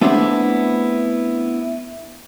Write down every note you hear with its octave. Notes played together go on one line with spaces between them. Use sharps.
A3 B3 C4 D4 E4 G#4